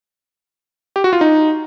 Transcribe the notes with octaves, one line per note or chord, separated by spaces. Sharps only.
G4
F#4
F4
D#4